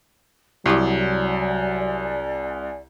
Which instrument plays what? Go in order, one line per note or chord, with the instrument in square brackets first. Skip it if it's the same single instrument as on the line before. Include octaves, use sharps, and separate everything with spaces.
[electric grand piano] C2 [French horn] F#3 [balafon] E4 G4 D6 [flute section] D5 G#5